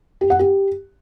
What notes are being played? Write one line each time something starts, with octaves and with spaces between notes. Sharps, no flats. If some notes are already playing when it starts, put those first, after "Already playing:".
G4
F#5
G4